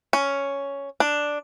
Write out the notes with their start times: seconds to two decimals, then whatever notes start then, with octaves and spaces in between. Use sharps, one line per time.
0.13 C#4
1.00 D4